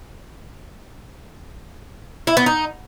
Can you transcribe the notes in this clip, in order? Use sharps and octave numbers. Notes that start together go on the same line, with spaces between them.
E4
B3
D#4